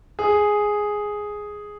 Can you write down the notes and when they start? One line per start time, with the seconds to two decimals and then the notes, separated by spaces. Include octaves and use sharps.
0.19 G#4